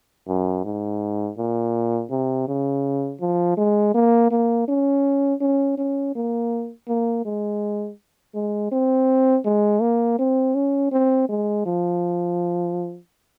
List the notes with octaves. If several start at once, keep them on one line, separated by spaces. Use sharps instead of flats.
F#2
G#2
A#2
C3
C#3
F3
G#3
A#3
A#3
C#4
C#4
C#4
A#3
A#3
G#3
G#3
C4
G#3
A#3
C4
C#4
C4
G#3
F3